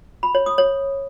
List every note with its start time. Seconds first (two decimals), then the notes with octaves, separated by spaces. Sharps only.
0.23 B5
0.35 C#5
0.46 D#6
0.58 C#5